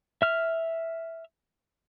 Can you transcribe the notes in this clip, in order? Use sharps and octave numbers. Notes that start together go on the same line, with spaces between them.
E5 F6